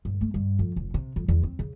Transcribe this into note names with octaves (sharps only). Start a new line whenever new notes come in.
G2
A3
G2
F2
F1
C3
F2
E2
C4
C#3